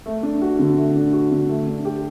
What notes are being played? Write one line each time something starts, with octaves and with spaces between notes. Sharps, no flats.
A3
D4
F#4
D3
A3
D4
F#4
D3
A3
D4
G4